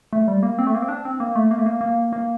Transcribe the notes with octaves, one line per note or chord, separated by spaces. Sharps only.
A3
G3
A#3
C4
A3
A#3
C4
D4
C4
A#3
A3
A#3
A3
A#3
A#3
A#3